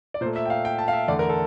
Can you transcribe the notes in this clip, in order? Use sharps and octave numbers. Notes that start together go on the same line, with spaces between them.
D5
A#2 A3 C5
E5
G5
F5
G5
A5
F5
E5
E2 D3 A3 D5
A#4
A4